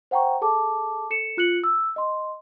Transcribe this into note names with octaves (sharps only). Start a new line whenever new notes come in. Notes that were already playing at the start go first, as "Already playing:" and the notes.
C5 F#5 G5 A#5 C#6
G#4 A4 A5 D6
A4 C#7 E7
F4 F#6 C#7 F#7
E6
D#5 C6